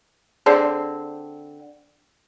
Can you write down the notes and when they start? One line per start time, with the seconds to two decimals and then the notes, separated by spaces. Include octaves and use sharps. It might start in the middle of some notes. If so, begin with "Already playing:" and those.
0.46 D3 C4 G#4 D5 C7